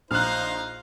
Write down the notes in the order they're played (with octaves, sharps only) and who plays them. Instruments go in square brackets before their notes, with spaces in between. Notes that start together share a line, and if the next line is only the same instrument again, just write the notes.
[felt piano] A#1 [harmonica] D#4 C5 [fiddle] F5 A#5 [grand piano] F6 F#6